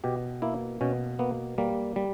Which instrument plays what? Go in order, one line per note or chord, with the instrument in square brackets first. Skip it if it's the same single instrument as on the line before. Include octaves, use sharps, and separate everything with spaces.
[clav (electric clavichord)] B2 G4
A#3 E4
B2 C#4
A#3 B3
G3 A#3
G3